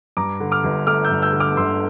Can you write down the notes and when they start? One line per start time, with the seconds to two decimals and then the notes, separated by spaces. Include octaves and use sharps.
0.17 G2 A#5 D6
0.40 D3
0.52 D6 F6
0.64 G1
0.87 A3 D6 F6
1.05 E6 G6
1.10 G2
1.22 E6 G6
1.33 D3
1.40 D6 F6
1.57 G1 C6 E6